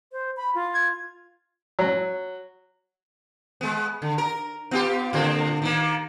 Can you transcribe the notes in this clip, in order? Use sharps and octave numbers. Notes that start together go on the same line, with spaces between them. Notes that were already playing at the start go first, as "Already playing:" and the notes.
C5
B5
F4
G#6
F#3
G#3 B3
D3
A#4
B3 F4 G4
A2 D3 C4
D#3 A#3